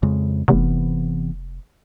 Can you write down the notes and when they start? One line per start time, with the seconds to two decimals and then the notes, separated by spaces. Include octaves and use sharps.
0.03 F2 C#3 G#3
0.48 F1 C3 E3 B3